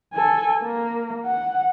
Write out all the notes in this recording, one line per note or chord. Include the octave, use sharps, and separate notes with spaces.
A4 G#5
A#3
F#5